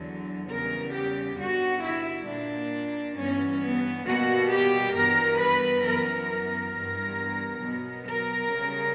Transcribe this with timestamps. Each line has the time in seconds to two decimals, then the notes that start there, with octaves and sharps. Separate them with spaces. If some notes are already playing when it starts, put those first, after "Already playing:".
Already playing: E2 D3 F#3
0.49 E2 C#3 G3 B3 A#4
0.94 G4
1.38 G2 D3 G3 B3 F#4
1.82 E4
2.27 A#2 A#3 D4
3.16 G2 E3 B3 C#4
3.60 B3
4.06 B2 G3 A#3 F#4
4.50 G4
4.94 G2 E3 G3 B3 A#4
5.39 B4
5.83 F#2 E3 B3 A#4
6.28 A#4
6.73 G2 E3 G3 B3
7.62 B2 F#3 B3
8.06 A#4
8.51 C#3 G3 B3